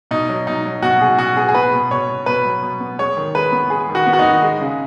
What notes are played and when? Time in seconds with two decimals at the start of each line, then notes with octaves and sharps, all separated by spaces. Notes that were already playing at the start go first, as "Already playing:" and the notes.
0.11 B2 D#4
0.29 F#3
0.47 B2 D#4
0.66 F#3
0.82 B2 F#4
1.01 B2 G#4
1.18 B2 F#4
1.37 B3 G#4
1.49 G#4
1.55 B3 B4
1.73 B2
1.90 B2 C#5
2.09 B2
2.26 B2 B4
2.45 F#3
2.62 B2
2.80 B3
2.99 G#3 C#5
3.17 D#3
3.35 G#3 B4
3.52 B3
3.70 G#3 G#4
3.89 D#3
3.95 F#4
4.06 B3
4.13 F#4
4.19 D#4
4.24 D#3
4.42 G#3
4.61 C#3